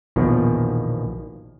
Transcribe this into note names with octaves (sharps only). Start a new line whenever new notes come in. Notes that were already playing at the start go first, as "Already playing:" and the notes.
A#1 E2 B2 D#3 F3